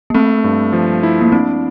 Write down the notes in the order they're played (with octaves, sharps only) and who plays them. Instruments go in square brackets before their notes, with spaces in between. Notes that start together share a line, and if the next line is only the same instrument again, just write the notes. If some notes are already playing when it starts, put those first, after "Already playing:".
[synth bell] A#3
[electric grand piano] A3 [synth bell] C4
[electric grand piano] G2
F3
E4
[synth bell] A#3
[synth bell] C4 [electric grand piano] D4